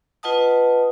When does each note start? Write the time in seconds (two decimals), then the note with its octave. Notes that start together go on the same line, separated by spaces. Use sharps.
0.23 F4 B4 D#5 F#5 A5 D#6